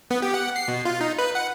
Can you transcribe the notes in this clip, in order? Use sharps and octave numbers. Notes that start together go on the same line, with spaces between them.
B3
G4
F#5
C7
B2
F4
D#4
B4
F#5